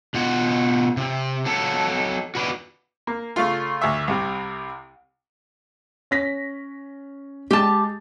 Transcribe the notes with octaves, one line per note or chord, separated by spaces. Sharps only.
B2 F4 F#5
C3
F#3 A4
F#4 B4 D5
A#3
C#3 A3 F4
D2 E5
C2 C3
C#4 A#6 B6
G#3 G4 A5 A6